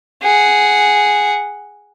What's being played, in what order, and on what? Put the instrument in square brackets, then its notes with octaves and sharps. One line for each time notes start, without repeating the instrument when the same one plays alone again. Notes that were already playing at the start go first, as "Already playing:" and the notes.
[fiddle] G#4 F#5